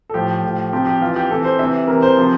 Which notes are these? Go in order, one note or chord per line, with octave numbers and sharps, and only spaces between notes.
A4
A2 F3 G4
A2 F3
C3 F3 G4
G4
C3 E3 F4
G4
C3 E3 A4
C5
C3 E3 E5
C3 E3 A#4
C5
C3 F3